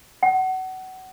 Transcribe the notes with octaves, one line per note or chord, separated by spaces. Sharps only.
F#5